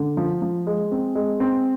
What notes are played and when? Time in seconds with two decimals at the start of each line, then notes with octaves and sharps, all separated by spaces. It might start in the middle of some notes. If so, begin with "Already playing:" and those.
Already playing: D3
0.17 F3
0.42 F3
0.67 G#3
0.91 C4
1.15 G#3
1.40 C4